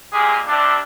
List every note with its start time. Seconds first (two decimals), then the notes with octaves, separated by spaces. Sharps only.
0.13 A#2 G#3 A#3 G4 G#4
0.47 C3 G3 D4